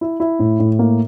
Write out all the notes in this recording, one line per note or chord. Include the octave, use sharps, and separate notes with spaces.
E4
E4
A2
A2
A#3